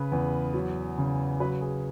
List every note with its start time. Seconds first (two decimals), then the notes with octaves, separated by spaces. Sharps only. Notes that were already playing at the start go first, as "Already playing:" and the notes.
Already playing: C#3 B4
0.12 E2
0.54 F#3
0.98 C#3
1.40 F#3 B4
1.61 G#4